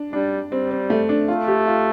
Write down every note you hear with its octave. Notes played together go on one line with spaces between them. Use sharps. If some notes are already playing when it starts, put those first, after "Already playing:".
Already playing: D4
G3 D4
G3 C4
C4
A3
D4
A3 F4
G4
F4